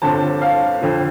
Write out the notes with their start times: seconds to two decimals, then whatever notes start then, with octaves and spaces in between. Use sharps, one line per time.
0.02 G1 G2 D3 F3 C4 A5
0.42 F5
0.81 F2 D3 F3